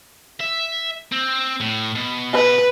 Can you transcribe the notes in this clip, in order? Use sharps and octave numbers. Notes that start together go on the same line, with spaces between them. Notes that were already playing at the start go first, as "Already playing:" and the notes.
E5
C4
A2
B2
B4